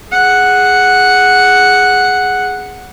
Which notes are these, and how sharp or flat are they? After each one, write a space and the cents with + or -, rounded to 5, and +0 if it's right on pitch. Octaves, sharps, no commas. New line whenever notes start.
G#4 +0 F#5 +0